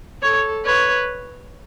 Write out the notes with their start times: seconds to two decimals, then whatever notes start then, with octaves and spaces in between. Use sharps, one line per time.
0.23 A4 C#5
0.65 B4 C#5